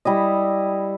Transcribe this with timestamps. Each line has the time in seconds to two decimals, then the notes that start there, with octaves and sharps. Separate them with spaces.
0.05 G3 E4 D#5